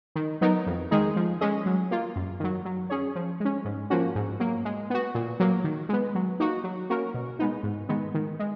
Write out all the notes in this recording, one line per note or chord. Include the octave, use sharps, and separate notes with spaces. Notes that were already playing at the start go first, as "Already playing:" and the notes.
D#3
F#3 B3 D#4 A#4
F2
D#3 G#3 D#4 G#4
F3
G#3 C#4 G#4 D#5
F#3
A#3 F4
F#2
D#3 F#3
F#3
C#4 G#4 C#5
F3
G#3 C#4
G#2
F3 A#3 C#4 F#4
G#2
F#3 A#3
G#3
B3 F#4
A#2
F#3 A#3
D#3
G#3 B3
F#3
A#3 D#4 F#4
F#3
A#3 C#4 F#4 A#4
B2
G#3 B3 D#4
G#2
D#3 G#3 B3
D#3
G#3